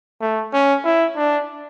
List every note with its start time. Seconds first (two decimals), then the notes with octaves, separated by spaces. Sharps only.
0.21 A3
0.53 C#4
0.85 E4
1.16 D4